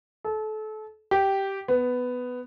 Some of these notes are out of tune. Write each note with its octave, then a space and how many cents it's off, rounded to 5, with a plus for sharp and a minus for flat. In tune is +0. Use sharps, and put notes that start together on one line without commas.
A4 -30
G4 -10
B3 +10